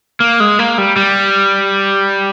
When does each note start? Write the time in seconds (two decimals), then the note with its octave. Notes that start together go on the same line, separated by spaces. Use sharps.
0.20 A#3
0.40 G#3
0.59 A#3
0.78 G3
0.96 G3